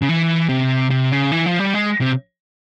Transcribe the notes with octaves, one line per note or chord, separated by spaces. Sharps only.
C#3
E3
C3
C3
C#3
E3
F3
G3
G#3
C3